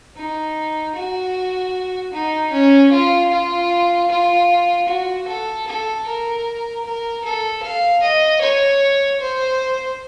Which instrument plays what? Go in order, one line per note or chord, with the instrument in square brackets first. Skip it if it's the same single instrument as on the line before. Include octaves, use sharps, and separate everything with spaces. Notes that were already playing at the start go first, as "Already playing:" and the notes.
[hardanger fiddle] D#4
F#4
D#4
C#4
F4
F4
F4
F#4
A4
A4
A#4
A#4
A4
F5
D#5
C#5
C5